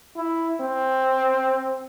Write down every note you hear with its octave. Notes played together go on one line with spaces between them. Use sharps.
E4
C4